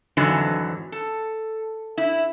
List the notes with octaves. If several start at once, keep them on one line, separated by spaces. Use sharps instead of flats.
F2 G#2 D3 E3 F#3
A4
E4